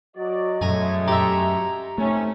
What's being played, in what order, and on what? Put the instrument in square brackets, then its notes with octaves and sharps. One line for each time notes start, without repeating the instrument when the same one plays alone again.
[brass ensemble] F#3 F#4 D5 [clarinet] D#5
[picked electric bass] F#2 [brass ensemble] G#3 A3 C#5 [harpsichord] G#5 A#5
[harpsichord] G4 E5 [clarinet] A#5
[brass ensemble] C3 C#4 [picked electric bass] A3 [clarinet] D#4